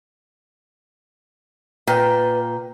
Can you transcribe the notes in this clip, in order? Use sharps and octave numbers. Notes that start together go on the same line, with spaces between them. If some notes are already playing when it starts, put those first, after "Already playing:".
A#2 B4 G5